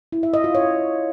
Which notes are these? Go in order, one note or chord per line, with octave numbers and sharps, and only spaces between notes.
E4
E5
D#5
F4
C#5